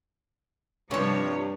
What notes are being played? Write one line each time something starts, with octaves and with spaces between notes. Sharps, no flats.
G2 C3 F3 G3 C#5